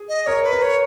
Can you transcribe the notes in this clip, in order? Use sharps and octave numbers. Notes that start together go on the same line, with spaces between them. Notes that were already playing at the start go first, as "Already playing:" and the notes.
Already playing: G#4
D#5
A#4 C#5
B4
A#4
C#5